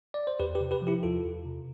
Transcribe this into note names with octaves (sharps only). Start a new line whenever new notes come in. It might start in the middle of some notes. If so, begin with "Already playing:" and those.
D5
C5
E2 G4 B4
G4 B4
C3
G4 B4
F3
E4 G4
E2 F4 A4
E2
C3